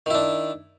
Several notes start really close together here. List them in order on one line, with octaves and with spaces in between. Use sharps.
D#3 E4 D4